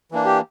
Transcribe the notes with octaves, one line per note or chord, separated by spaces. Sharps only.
E3 A#3 D4
G4